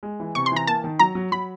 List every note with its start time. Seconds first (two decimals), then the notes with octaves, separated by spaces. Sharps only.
0.03 G#3
0.20 E3
0.35 C3 C#6
0.46 C6
0.52 E3 A#5
0.67 A#3 A5
0.84 D#3
0.99 F#3 A#5
1.15 F#3
1.32 F#3 B5